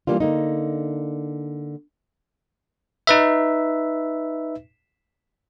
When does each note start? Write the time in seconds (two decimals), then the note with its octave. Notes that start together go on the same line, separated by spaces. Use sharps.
0.07 E3 F3 G3 A#3 D4 F4
0.20 D3 A#3 D#4
3.07 D#4 B4 E5